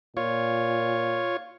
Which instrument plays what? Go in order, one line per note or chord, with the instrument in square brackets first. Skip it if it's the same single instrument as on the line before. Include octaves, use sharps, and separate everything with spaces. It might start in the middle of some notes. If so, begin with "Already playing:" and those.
[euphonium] A#2 [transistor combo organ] F4 C#5